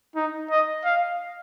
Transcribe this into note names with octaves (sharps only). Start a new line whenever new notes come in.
D#4
D#5
F5